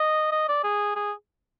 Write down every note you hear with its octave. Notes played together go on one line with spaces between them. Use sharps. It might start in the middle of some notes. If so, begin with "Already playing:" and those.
Already playing: D#5
D#5
D5
G#4
G#4